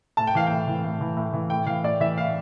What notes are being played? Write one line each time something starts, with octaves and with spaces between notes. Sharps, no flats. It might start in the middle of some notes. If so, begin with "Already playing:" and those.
A2 A5
G5
E3 F5
A2 G5
E3
A2
E3
A2
E3
A2 G5
E3 F5
A2 D5
E3 E5
A2 F5